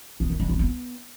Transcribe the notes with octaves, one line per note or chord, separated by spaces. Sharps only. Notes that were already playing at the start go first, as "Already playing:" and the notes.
B3
D#3
G3
C4
B3